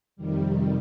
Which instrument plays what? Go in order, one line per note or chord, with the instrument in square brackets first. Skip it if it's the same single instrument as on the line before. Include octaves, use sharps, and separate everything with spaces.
[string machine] F2 C3 D#3 G3